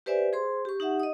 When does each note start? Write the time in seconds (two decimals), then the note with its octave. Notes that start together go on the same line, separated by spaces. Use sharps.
0.06 G4 B4 C5 D5 E5 G#5
0.33 G#4 C5 C6
0.65 G4 C#6
0.80 D#4 G4 E5 F#5
1.00 D#5 D#6